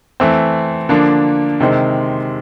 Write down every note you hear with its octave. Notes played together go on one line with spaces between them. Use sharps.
E3 A3 C4
D3 F3 A#3 D4
C3 D#3 G#3 C4